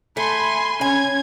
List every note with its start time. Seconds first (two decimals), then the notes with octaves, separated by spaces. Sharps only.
0.17 A3 G#5 B5 C6
0.81 C#4 G#5 G#6